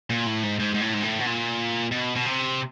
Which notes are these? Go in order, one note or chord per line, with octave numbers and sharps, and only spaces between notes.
A#2
A2
G#2
G#2
G#2
A2
G#2
A2
B2
A#2
B2
B2
C3